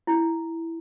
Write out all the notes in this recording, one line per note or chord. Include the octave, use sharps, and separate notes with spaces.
E4